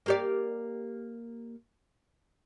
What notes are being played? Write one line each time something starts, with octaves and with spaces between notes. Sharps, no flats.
A#3 G4 D5